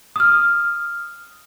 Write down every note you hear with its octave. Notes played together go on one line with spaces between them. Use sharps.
D#6 F6